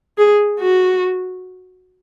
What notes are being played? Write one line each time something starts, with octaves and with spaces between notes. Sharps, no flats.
G#4
F#4